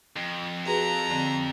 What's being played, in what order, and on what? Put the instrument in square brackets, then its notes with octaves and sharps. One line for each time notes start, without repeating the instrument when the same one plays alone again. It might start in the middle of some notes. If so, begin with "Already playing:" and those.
[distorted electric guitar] F2
[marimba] F#4 G#4 B4 [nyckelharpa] A#5
[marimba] D3 C4